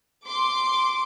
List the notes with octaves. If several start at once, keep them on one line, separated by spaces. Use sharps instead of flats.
C6 D6